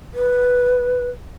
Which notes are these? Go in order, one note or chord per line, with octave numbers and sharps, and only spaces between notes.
B4